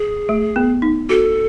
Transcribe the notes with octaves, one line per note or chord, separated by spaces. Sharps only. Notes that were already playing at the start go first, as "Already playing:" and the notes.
Already playing: G#4
A3
B3
D#4
F#4 A4